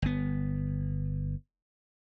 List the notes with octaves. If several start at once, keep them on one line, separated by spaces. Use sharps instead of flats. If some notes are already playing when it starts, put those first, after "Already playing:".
G1 B3